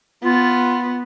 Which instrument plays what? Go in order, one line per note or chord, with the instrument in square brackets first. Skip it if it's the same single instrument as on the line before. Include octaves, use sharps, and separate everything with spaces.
[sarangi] B3 [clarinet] F4